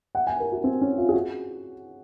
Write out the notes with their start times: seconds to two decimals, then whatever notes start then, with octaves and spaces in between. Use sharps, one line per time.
0.15 F#5
0.27 G#5
0.40 A#4
0.52 F#4
0.64 C4
0.81 C#4
0.98 F4
1.09 G#4
1.13 F#4